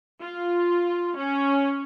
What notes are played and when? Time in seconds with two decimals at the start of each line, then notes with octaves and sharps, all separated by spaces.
0.21 F4
1.18 C#4